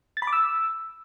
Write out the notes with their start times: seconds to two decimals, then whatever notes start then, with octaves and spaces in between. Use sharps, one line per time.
0.17 A6
0.22 B5
0.27 D6
0.33 E6